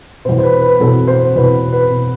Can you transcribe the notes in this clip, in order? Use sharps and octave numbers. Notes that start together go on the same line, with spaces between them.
E2 B2 C5
C5
B4
B4
E2 B2 A4
C5
E2 B2 B4
B4
B2